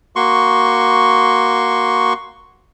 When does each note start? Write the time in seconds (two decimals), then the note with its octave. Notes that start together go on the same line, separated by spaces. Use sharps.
0.16 A#3 F#4 C6 C#6